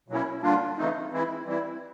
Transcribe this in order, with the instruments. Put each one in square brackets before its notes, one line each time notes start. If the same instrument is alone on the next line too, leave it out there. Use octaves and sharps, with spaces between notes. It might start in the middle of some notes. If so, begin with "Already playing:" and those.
[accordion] B2 F#3 A#3 C#4 E4
D3 G3 A#3 D4 F4
C#3 E3 A3 C4 D#4
E3 G#3 C4 E4
E3 G3 C4 E4